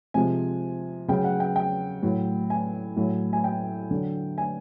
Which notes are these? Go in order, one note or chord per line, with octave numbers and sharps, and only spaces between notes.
C3 F3 G#3 G#5
C#3 F#3 G5
F#5
G5
G5
A2 F#3
G#5
A2 F#3
G#5
G5
D3 F#3
G#5